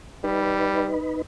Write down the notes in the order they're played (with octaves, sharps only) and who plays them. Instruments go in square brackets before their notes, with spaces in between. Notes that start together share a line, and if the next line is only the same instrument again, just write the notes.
[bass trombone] G3 [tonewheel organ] D#4 B4